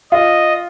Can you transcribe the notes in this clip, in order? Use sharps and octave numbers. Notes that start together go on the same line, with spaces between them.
F4 D#5